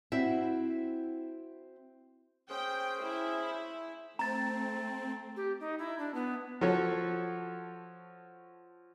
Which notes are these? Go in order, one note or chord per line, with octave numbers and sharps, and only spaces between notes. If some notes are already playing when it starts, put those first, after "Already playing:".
C4 E4 F#4 E5
C#4 G#4 C5 G5
E4
A3 C4 A#5 A6
G4
D#4
E4
D4
B3
F3 F#4 A4 C#5